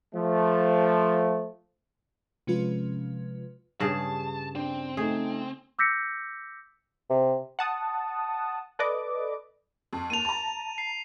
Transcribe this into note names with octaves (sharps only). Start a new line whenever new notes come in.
F3 A3
C3 F3 G#3 C#4 F4 B4
G2 C#3 G#4 A5
C4 D4
A3 D#4 G#4
D6 E6 G6 A#6 B6 C#7
C3
F#5 A5 D#6
A4 B4 D5 D#5 D6
F2
D#2 A5 D#7 F7
A5 A#5
C7